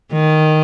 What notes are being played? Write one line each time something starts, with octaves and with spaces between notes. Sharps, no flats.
D#3